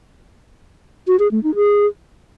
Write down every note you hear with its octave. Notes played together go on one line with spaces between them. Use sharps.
F#4
G#4
A3
D#4
G#4